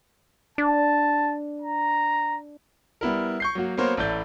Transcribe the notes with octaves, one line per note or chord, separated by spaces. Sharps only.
D4 A5
A#5
G3 B3 E4 A#4
C#6 G6 C7
F#3 A#3 F#4
F#3 A#3 B3 A#4 C5 C#5
A1 A2 E4 D5 G6